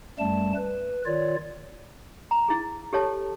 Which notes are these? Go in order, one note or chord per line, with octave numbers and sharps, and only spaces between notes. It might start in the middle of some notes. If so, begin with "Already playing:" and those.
F#2 G3 A3 A5
B4
D#3 F4 C#5 D5
A#5
E4 G#4
G4 A4 C#5 A5